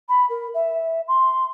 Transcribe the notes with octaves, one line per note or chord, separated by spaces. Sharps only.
B5
A#4
E5
C6